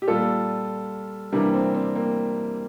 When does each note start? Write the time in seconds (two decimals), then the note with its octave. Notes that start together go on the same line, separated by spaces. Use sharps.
0.02 G4
0.07 A#2 G3 F4 A4
1.33 C3 E3 G3 A#3 D4
1.54 C4
1.74 C4
1.95 A#3